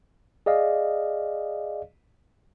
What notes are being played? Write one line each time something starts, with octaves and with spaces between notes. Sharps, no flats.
G#4 D5 D#5 F5